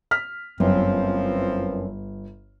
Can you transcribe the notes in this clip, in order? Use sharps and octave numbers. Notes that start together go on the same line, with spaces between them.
F6 B6
G1 F#2 E3 F3 C4